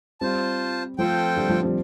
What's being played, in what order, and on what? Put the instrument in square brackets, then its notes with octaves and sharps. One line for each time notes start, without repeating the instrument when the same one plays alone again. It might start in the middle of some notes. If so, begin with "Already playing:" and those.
[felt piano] G3 C4 [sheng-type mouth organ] F4 C5 A5
[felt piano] F3 A3 [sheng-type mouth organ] C4 F4 A4 C5 G5
[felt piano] D3 G3
F3 A3
G3 C4